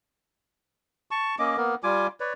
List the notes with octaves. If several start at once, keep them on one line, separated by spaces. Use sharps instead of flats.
A5 C#6
A#3 C#4 D#5 D6
A#3 B3 A#4
G3 F4 G#5 D6
B4 C#5 D5